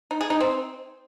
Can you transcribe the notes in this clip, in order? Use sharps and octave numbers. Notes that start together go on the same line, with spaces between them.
D#4
G#4
D#4
C4